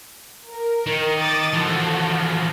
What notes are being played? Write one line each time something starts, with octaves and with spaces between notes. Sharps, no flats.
A#4
D#3
D6 D#6 A6
E3 F3 F#4 A4